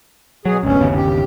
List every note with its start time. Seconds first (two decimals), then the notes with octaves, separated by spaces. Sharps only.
0.45 B2 F#3 G#4
0.63 G#1 D2 B2 C#4
0.79 G1 D#2 C#3
0.95 G4